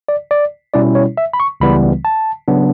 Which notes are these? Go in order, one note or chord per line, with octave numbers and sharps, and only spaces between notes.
D5
D5
B2 G3 C#4 E4 D5
C#5
E5
B5
C#6
C#2 C#3 E3 G3 B3 B5
A5
C#3 F#3 B3 D4